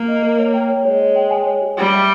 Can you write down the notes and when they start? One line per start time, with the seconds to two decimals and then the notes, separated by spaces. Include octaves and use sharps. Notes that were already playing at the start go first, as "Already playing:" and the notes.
Already playing: A#3
0.08 D#5
0.23 A#4
0.39 C#5
0.54 G5
0.69 C#5
0.84 G#3 C#5
1.00 C#5
1.16 G5
1.31 G#5
1.46 C#5
1.62 G4
1.77 G3 G5
1.93 E5